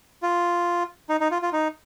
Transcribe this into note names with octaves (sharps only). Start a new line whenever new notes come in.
F4
D#4
D#4
F4
F4
D#4